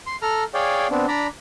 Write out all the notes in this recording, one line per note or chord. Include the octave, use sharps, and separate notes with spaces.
C6
A4 A#5 F6
G#4 C#5 D5 F5 G5
B3 C4 D4
D4 D5 A#5 B5